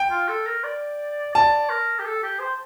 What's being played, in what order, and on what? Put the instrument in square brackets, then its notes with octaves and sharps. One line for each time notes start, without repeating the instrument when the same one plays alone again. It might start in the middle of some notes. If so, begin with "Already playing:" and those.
Already playing: [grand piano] G5
[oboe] F4
A4
A#4
D5
[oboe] D5 [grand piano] A5
[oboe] A#4
G4
A4
G4
C5